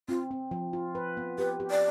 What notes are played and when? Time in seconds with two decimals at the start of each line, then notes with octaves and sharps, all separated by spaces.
0.09 C4 F4
0.31 C4
0.51 F3
0.73 F4
0.95 B4
1.17 B3
1.38 G4 B4
1.60 G4
1.71 D5